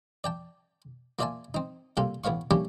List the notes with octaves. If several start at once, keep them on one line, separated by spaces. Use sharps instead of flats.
D5 G5 A5
A#3 F4 D5 E5 G#5 A5
C4 D#4
C3 G3 A#3 F4 A4
A1 B3 C#5 F5 C#6
G3 A3 A#3 C#4 D4 G4